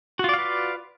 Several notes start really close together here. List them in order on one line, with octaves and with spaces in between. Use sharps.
F#4 F4 D5 F5 B4